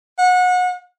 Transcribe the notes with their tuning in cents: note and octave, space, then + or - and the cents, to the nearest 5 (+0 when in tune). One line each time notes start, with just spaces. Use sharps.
F#5 -30